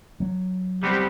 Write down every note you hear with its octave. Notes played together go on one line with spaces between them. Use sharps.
F#3
G3 B3 C4 G4